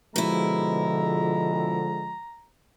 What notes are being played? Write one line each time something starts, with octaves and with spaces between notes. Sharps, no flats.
B2 D3 F3 G#3 E4 A#5